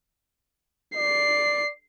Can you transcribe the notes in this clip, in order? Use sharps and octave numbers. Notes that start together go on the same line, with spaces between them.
D5 C7